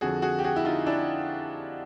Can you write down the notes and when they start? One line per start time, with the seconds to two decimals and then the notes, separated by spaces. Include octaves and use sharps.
0.01 F2 D3 F3 F#4 G#4
0.22 F#4 G#4
0.39 G4
0.44 F#4 G#4
0.56 E4
0.65 D#4 F4
0.86 D4 E4